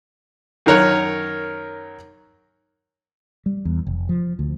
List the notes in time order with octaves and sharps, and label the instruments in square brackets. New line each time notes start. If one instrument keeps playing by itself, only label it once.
[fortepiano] F#2 D#3 A#4 C#5 F#6
[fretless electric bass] G3
E2
F1
F3
D2